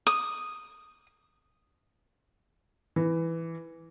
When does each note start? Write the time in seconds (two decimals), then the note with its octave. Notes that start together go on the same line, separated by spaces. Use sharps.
0.07 D#6
2.96 E3